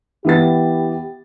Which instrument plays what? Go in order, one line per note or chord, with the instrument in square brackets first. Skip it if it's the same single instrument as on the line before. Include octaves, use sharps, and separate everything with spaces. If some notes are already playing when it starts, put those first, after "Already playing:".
[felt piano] E3 B3 A6 [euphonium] G4